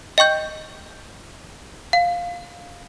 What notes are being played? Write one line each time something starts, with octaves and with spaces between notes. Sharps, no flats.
D#5 G5 C#6 G6
F5